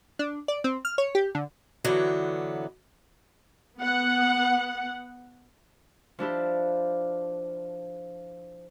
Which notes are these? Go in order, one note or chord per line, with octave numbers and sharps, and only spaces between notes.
D4
D5
C4
F6
C#5
G4
D3
D3 E3 F#3 B3
B3 F#5
F3 D4 E4 G4